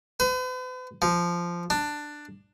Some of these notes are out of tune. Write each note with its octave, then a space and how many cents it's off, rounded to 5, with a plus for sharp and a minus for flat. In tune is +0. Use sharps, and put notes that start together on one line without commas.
B4 +45
F3 -10
D4 +10